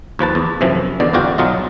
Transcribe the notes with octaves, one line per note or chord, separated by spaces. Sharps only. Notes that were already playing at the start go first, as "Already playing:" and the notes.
D#2 F3 B4 A5
E2
F#2 C3 E3 F3
E2 B2 D3 D5
G1 E2 F4 F#4 G5
B1 F#3 F4 D#5